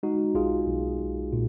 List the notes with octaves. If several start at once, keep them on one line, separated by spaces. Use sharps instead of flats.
G#3 D#4 F#4
B1 F4 G#4
B1
B1
A#2